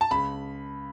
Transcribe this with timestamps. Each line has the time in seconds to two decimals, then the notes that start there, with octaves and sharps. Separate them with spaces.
0.01 A5
0.11 C#2 B5